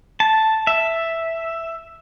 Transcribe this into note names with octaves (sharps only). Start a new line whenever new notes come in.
A5
E5